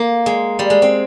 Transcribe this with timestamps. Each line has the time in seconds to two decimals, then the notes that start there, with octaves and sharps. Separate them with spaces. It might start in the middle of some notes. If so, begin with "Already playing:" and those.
Already playing: A#3
0.26 G#3
0.59 G3
0.70 G#3
0.82 C4